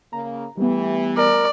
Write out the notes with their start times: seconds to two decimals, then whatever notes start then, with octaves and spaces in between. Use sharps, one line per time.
0.13 C#3 A#3 A#5
0.57 E3 G3 A3 B3 G4
1.17 A#4 D5